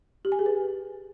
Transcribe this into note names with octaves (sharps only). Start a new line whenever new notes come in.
G4
G#5
G#4
B4